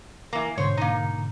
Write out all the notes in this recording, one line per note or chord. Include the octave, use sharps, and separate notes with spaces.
E3 A#3
G#2 B2 D3 C5 C#5
A#3 D#4